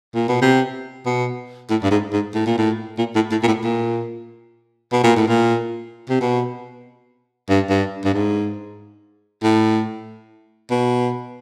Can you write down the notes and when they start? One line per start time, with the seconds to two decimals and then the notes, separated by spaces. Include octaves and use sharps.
0.15 A#2
0.29 B2
0.42 C3
1.06 B2
1.70 A2
1.83 G2
1.91 G#2
2.13 G#2
2.34 A2
2.46 A#2
2.58 A2
2.98 A#2
3.15 A2
3.31 A2
3.43 A#2
3.47 A2
3.64 A#2
4.92 B2
5.03 A#2
5.16 A2
5.28 A#2
6.09 C3
6.21 B2
7.49 G2
7.69 G2
8.05 G2
8.13 G#2
9.43 A2
10.71 B2